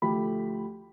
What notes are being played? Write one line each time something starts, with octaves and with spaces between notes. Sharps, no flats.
D2 F3 A3 G4 B5